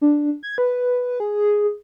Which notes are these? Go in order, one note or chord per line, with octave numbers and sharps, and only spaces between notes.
D4
G#6
B4
G#4